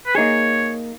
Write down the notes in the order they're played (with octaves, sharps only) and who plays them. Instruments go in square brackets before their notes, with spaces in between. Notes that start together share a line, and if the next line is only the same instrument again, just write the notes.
[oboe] B4
[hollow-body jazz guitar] A#3 D#4 G#4 [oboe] C#5